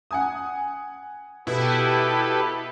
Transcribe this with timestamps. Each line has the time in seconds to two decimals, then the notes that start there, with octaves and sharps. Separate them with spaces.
0.11 F#5 G#5 D#6
1.47 B2 E4 G4 A4 B4